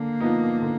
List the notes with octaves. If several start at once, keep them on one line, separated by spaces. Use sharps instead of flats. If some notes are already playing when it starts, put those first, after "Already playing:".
Already playing: D3 A#3
F3 B3 D#4
D3